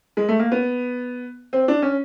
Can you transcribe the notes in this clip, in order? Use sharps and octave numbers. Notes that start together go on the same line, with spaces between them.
G#3
A3
A#3
B3
C4
D4
C#4